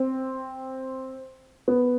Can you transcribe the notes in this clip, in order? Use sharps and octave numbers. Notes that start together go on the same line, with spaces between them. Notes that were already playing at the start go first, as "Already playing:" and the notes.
Already playing: C4
B3